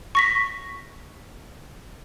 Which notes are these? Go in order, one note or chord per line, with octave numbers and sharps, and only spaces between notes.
C#6 A#6 B6